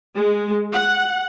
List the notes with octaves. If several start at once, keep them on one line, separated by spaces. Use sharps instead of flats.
G#3
F#5